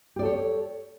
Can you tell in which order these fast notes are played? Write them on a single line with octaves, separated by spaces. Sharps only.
G4 D5 A4 C#5